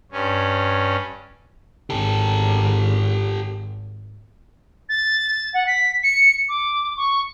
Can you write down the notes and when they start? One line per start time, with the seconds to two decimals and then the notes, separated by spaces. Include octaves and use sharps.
0.12 G2 C#4
1.90 G#1 G4 A4
4.89 A6
5.54 F#5
5.67 B6
6.03 C#7
6.49 D6
6.97 C#6